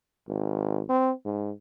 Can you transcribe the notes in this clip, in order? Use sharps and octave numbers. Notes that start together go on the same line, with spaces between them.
G#1
C4
G#2